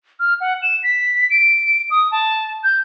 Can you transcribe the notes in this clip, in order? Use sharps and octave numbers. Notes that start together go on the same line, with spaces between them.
F6
F#5
E7
B6
D7
D#6
A5
G6